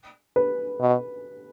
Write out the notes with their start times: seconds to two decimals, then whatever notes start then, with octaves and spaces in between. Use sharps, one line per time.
0.36 B4
0.80 B2